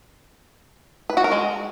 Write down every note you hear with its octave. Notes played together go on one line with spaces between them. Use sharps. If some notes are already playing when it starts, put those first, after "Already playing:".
B4
F#4
A#4
G#3